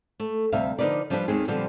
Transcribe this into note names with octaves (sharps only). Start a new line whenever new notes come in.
A3
D2 C3 G3 E5 F5
D3 F3 D#4 A#4 B4 D5
F3 G3 D4 F4 G#4 B4
D#2 D#3 G#3 C4 G#4
A#2 D3 F3 G3 B3 C4